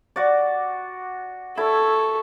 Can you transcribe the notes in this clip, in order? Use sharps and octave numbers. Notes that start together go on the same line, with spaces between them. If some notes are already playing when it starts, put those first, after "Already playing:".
F#4 D5
E4 A4 C#6